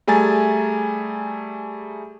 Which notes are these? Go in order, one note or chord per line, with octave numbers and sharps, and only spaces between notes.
G3 A3 G#4 G#5 A#5 A6